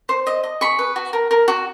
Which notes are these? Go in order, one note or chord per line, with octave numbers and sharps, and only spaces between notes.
C5
D#5
D#5
G#4 B5 C#6
B4
F#4
A#4
A#4
F#4